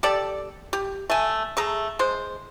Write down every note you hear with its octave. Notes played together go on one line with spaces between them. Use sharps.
G4 A4 D5
G4
A3 G#5
A3 G#4 A#5
G#3 C5